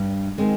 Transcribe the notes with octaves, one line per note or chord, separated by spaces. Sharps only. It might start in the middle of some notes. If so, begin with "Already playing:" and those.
Already playing: G2
D#3 G#3 C4